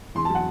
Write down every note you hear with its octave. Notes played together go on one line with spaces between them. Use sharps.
E2 C6
A5
F#3
F#5